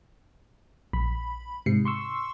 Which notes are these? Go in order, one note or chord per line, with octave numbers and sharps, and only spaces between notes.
A#1 B5
G#2 C3 C7 C#7
C6 C#6 E6